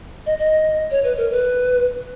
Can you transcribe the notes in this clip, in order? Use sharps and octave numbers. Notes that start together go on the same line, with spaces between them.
D#5
D#5
C#5
B4
A#4
B4